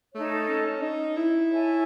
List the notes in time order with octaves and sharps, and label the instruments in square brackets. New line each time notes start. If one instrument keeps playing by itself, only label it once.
[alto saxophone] A3 [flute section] D#4 A4 C#5
[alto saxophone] C#4
D#4
E4
[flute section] A4 C#5 E5 G#5